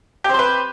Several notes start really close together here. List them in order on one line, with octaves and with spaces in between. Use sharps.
G4 C4 C5 B4